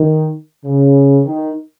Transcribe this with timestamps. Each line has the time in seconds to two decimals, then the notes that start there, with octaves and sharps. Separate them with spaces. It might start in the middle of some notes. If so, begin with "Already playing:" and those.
Already playing: D#3
0.65 C#3
1.24 D#3